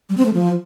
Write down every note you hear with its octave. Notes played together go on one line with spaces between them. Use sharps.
G3
C4
A3
F3